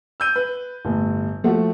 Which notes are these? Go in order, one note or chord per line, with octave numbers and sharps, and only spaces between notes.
E6 G6 D#7
B4
G1 A2
F3 A3 F#4